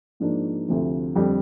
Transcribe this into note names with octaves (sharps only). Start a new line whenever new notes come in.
G#2 F3 A#3 D4
D2 C3 F3
F2 D3 G3 D4